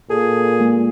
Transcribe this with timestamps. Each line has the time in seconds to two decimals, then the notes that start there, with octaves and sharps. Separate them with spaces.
0.10 A#2 G#4 A4
0.60 G#3 A#3